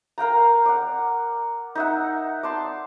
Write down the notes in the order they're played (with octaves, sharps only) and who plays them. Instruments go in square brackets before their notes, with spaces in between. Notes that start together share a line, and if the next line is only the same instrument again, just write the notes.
[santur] A#4 F5 G5 A#5
D5 F#5
D#4 E5 F#5
D5 A5 C6